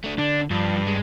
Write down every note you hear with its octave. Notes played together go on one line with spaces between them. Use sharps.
A3 D4
D3 D4
G2 F3
G#3